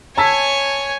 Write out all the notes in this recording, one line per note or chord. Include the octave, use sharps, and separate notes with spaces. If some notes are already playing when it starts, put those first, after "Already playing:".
C#5 G#5 A5 E6 B6